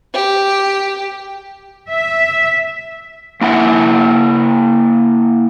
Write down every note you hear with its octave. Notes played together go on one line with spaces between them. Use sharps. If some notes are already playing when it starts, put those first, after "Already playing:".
G4
E5
A#3 E4 E5 F#5